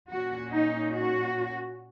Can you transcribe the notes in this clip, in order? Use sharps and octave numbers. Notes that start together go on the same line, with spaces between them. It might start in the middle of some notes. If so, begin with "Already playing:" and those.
A#2 A#3 C#4 F#4
D#4
F#4